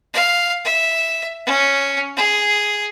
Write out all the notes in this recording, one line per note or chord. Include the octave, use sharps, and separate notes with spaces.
F5
E5
C#4
G#4